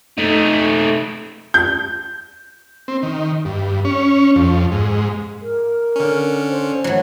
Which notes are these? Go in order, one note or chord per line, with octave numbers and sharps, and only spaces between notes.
A3 D#4
G6
C4
D#3
G2
C#4
F2
G#2
A#4
D3 C#4
C5
E3 F#3 A3